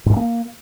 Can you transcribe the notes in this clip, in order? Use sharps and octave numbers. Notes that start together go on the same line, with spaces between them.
G#2
G2
A#3